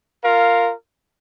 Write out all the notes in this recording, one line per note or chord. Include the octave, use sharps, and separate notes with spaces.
F4 A#4 F5